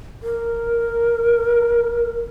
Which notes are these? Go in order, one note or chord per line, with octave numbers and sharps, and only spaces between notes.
A#4